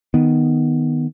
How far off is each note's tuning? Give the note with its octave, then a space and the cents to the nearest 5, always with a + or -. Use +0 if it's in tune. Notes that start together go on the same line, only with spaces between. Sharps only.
D#3 +0 B3 +0